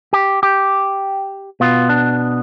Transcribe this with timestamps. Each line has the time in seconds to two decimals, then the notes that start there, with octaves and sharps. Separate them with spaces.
0.13 G4
0.43 G4
1.60 B2 B3 F4
1.89 D4